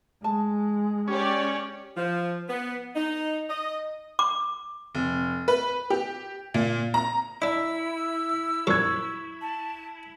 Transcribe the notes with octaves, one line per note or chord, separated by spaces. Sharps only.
G#3 A5
C#4 G4 C#5 D5
F3
B3
D#4
D#5
D6
F1
B4
G4
A#2
A#5
D4 E4 D#5 E6
F#2 A#2 F3 C#6 G#6
A5